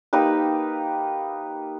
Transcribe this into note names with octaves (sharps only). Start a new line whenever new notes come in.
A#3 D#4 G4 B4